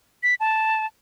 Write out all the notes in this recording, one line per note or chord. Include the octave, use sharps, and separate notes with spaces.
B6
A5